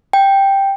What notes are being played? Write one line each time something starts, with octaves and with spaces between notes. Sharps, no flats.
G5